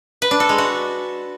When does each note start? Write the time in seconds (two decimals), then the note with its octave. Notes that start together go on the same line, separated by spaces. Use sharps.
0.22 B4
0.31 D4
0.40 A4
0.49 G#3
0.58 F#4